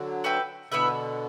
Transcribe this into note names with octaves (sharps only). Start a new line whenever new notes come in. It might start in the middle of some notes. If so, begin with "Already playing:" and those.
Already playing: D3 F#3
F#4 B4 E5 G5
B2 D3 B3 E4 B4 E5